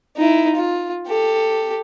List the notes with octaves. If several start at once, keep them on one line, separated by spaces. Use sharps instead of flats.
D#4 E4
F4
G4 A4